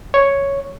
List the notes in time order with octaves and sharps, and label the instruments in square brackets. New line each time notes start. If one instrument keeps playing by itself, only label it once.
[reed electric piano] C#5